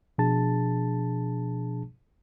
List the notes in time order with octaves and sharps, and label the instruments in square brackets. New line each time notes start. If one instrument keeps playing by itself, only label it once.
[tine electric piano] B2 F3 D4 G#4 A5 A6